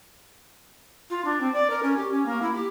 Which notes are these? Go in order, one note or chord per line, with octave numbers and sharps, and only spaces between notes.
F4
D4
C4
D5
A#4
C#4
G4
C#4
A#3
E4
G4